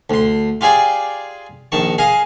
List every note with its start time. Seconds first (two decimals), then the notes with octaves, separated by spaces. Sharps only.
0.10 D2 C6
0.61 F4 G4 G#4 D5 G5
1.72 A#1 D#3 A5 C#6
1.98 G#4 D#5 F5